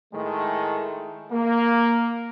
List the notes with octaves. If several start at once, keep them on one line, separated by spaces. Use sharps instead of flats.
A2 D#3 G#3 A3
A#3